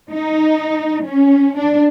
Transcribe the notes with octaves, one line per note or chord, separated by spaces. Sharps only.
D#4
C#4
D4